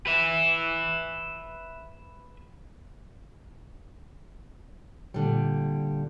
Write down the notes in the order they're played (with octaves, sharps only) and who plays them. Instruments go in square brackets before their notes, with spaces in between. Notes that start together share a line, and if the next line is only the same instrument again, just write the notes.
[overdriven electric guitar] B4 E5
[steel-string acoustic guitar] A#2 D3 G3